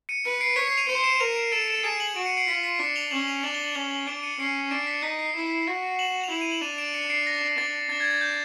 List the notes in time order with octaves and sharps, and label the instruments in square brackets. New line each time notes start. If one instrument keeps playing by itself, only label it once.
[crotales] C#7 D#7
[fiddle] B4 [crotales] C#7 D#7
[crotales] C7 D7
[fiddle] C#5 [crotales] B6 C#7
[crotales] C7
D#7 F7
[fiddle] C5 [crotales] C#7 D#7
[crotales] D7 E7
[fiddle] A#4 [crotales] D#7 F7
[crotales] D7 E7
[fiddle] A4 [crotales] D7 E7
[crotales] D7 E7
[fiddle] G#4 [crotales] D7 E7
[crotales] E7 F#7
[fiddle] F#4 [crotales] D7 E7
[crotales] C#7 D#7
C7 D7
[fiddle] F4 [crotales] B6 C#7
[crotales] B6
[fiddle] D4 [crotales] B6 C#7
[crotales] F7 G7
[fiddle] C#4 [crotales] E7 F#7
[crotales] D#7 F7
[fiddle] D4 [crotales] E7 F#7
[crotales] F7 G7
E7 F#7
[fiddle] C#4 [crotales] F7 G7
[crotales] E7 F#7
[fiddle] D4 [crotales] D7 E7
[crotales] C#7 D#7
[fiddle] C#4 [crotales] C7 D7
[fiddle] D4 [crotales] C7 D7
[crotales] B6 C#7
[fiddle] D#4 [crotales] B6
[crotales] C7
[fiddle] E4
F#4
[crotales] E7 F#7
F7
[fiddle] E4 [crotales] E7 F#7
[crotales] D#7 F7
E7 F#7
[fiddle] D4 [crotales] D#7 F7
[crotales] D7 E7
C#7 D#7
C7 D7
A#6
[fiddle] D4 [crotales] A6
[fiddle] D4 [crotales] A6
[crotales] G#6
A6
G6